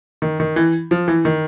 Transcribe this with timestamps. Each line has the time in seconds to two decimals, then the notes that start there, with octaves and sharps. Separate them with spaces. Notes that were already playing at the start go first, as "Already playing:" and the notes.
0.22 D#3
0.40 D#3
0.56 E3
0.91 F3
1.08 E3
1.25 D#3